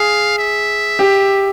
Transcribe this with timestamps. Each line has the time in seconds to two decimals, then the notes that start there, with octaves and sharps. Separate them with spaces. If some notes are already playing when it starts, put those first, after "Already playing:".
Already playing: G#4 F5
0.38 E5
0.99 G4